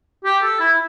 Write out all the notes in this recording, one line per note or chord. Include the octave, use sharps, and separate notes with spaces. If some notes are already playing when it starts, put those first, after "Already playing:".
G4
A4
E4